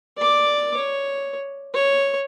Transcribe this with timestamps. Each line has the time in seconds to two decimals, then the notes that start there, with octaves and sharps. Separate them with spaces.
0.18 D5 D6
0.77 C#5
1.75 C#5